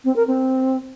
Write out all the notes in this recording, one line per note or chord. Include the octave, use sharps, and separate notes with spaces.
C4
A#4
C4